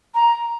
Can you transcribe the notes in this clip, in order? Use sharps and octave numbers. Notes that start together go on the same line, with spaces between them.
A#5